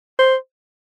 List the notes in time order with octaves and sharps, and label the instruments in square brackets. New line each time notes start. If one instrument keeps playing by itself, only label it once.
[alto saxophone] C5